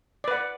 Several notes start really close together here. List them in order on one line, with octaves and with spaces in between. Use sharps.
D5 B4 F#5